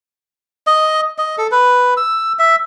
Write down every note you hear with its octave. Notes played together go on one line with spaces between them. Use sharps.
D#5
D#5
A4
B4
E6
E5